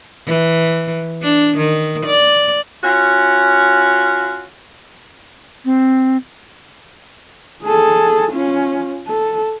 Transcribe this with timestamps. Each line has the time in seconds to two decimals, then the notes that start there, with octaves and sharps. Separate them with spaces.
0.27 E3
1.22 D4
1.57 D#3
2.06 D5
2.84 C#4 F4 F#4
5.65 C4
7.64 G#4 A4
8.32 C#4 F4
9.08 A4